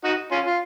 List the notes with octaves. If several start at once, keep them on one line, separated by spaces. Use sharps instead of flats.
D#4 F#4
C#4 F4
F4